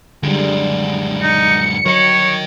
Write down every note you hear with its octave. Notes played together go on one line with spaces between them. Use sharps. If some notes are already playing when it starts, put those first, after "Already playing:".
F#2 D3 G3 G#3
D#4 C#7
F#3 A#4 C#5 D#5